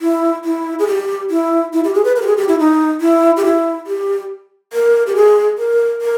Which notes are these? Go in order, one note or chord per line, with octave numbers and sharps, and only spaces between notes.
E4
E4
G#4
G4
E4
E4
G4
G#4
B4
A#4
G4
G#4
G4
E4
D#4
E4
G4
E4
G4
A#4
G4
G#4
A#4
A#4